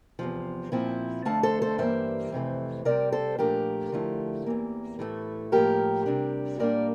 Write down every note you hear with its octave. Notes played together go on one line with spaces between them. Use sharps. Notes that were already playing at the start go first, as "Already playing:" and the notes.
E2 C3 F3
A#2 F3 C4 E4
F2 D3 A3 F5 A5
A4 C5
A4 C5
G2 E3 G3 A#3 C5 E5
F2 C3 E3 A3
C3 G3 C4 A#4 D5
A4 C5
A#2 F3 A3 D4 G4 A#4
D3 F3 A3 E4
E2 E3 A#3
A2 E3 A3
A2 F3 A#3 G4 A#4
C3 G3 D4
A#2 G3 A#3 D4 A#4 D5